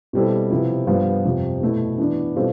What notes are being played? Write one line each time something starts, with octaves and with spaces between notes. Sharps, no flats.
B2 G3 C4 E4 A4
C3 F3 B3 E4
G2 F3 B3 F4
F2 C3 F3
B2 A3 E4
E3 B3 D4
B2 G3 C4 F4 A4